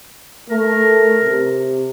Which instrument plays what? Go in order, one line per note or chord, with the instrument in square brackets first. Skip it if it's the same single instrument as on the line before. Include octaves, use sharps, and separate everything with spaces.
[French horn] A3 [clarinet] A#4
[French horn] C3